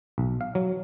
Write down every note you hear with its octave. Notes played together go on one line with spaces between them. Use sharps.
B1
F5
F#3